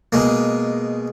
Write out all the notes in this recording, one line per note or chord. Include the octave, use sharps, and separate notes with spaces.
B2 G#3 A#3